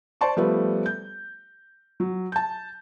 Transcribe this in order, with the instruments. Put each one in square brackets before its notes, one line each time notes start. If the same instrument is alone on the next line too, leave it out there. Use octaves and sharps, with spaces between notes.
[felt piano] C5 D5 A5 C6 C#6
F3 G3 A3 B3
G6
F#3
A5 G6